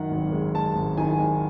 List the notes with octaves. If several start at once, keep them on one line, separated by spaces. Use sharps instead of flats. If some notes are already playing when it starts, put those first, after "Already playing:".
Already playing: F#2 D#3 F#5
G#1
G#3
G#3 A5
G#1
D#3 G#5
G#3